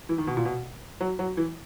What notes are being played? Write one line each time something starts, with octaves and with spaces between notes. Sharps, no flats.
E3
D#3
B2
A#2
B2
F#3
F#3
E3